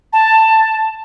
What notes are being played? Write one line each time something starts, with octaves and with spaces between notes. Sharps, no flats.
A5